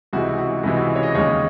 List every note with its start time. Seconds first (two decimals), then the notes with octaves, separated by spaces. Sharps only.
0.13 C#2 C3 E3 G#3 F#4
0.39 F#4
0.63 C#2 C3 E3 G#3 E4
0.77 F#4
0.95 C#5
1.03 D#5
1.15 D#2 C#3 G#3 C#5